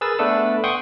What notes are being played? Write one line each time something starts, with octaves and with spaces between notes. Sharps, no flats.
G#4 A#4 B4 E6 A6
A3 B3 D4 A4 B4 E6
F#5 G5 C6 C#6 D#6